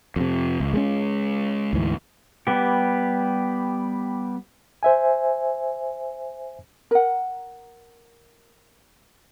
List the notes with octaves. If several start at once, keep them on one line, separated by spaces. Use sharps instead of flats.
F2 C3
C#2
G#3 A3 C#4
D2 G#2 E3
G3 B3 G4
C5 E5 G#5
A#4 F#5